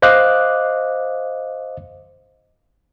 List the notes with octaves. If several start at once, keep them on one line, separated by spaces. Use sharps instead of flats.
C5 D#5 F5 D6 F#6